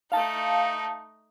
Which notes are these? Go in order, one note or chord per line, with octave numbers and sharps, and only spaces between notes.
A3 D#4 F5 A5